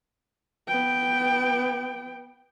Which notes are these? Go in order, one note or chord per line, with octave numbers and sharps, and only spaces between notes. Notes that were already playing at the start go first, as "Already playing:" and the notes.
B3 G5